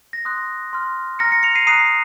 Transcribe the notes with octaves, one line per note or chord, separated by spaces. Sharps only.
A#6
C6 D#6 F#6
C6 F6
A#5 F6 A#6 C#7
A#6 C#7
C#7 F7
C7 D#7
A#5 D#6 F#6 C7 D#7